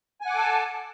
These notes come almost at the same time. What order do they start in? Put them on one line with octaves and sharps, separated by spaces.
G#5 F#5 D6 A4 A5